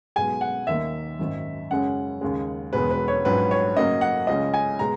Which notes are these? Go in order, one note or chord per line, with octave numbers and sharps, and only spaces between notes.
B1 B2 G#3 G#5
F#5
D#2 D#3 A#3 E5
G#1 F#2 D#3
F#2 C#3 G#3 C#4 F#5
D#2 C#3 G#3
E1 E2 B2 G#3 B4
B4
C#5
A#1 G#2 F#3 C#4 B4
C#5
F#2 C#3 F#3 A#3 D#5
F#5
C#2 C#3 G#3 C#4 D#5
G#5
B2 G#3 A#5